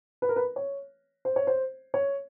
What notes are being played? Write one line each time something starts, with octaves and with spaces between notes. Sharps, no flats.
B4
A#4
B4
C#5
C5
C#5
C5
C#5